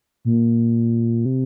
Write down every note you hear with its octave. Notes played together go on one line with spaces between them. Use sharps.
A#2
C3